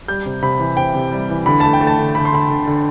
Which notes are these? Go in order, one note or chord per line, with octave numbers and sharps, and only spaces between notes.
G3 G6
C3
C3 B5
E3
C3 G5
C3
G3
E3
D3 B5
A3 A5
G5
A3
A5
D3
D3 B5
C6
D3 B5
D3
D3